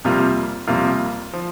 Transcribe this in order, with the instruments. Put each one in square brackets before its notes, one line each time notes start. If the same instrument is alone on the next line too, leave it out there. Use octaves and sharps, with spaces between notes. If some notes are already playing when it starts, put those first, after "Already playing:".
[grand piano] F2 C3 G3 A#3 F4
F2 C3 G3 A#3 F4
F3